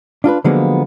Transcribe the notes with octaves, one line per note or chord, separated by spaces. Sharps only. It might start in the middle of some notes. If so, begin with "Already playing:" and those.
D4 F4 A4 B4
D3 F3 F#3 G#3 A#3 B3